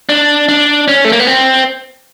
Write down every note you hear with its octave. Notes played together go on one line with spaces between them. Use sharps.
D4
D4
C#4
A3
A#3
B3
C4